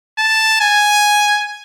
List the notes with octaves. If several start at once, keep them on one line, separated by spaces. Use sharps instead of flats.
A5
G#5